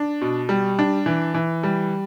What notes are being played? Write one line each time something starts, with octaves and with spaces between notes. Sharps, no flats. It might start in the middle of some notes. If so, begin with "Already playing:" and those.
Already playing: D4
B2
G3
D4
E3
E3
G3